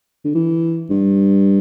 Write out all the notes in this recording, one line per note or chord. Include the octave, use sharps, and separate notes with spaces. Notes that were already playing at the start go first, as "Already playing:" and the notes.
D3
E3
G2